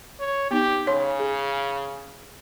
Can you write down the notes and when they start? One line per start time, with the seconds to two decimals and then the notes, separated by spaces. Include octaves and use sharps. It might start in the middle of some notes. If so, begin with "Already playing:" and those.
0.20 C#5
0.51 B3 D#4 G4
0.87 C#3 C#5 C6
1.19 G#4